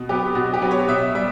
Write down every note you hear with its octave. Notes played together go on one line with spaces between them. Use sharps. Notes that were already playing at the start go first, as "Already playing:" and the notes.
Already playing: B2
F#3 B3 G4
B2 F#4
G4
F#3 B3
C#5
B2 E5
G3 E5